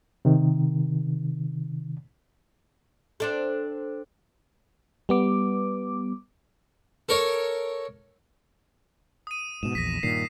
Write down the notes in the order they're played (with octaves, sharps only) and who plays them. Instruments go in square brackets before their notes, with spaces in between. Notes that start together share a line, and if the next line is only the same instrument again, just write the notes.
[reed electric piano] C3 D#3
[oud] C4 D4 A4
[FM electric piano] G3 B3 D6
[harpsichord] A4 A#4 C#5
[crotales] D#6 D#7
[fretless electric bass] G#2 B2 [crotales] E7
[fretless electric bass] A#1 E2 [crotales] A#6 B6
[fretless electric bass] G2 A#2 D#3 [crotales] C7